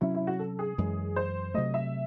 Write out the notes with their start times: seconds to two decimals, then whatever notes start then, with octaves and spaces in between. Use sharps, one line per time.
0.01 C3 F#3 C#4 E4
0.15 E4
0.27 F#4
0.39 A4
0.59 G#4
0.78 F#2 E3 G#3
1.16 C5
1.54 C3 F#3 A3 D#5
1.74 E5